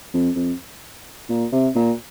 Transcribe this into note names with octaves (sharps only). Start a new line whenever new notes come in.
F2
F2
A#2
C3
A#2